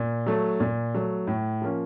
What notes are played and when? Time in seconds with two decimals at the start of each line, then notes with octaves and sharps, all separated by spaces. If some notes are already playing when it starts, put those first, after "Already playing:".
Already playing: A#2
0.26 F#3 A3
0.60 A#2
0.94 F#3 A3
1.27 A2
1.62 F3 A#3 C#4